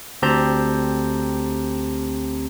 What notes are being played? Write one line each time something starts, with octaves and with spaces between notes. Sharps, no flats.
D2 C4 G4 A5 A#5 G6